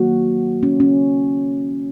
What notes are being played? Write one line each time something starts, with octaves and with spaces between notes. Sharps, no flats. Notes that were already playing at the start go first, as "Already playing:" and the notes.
Already playing: D#3 F#3 A#3 F#4
C#4
C#4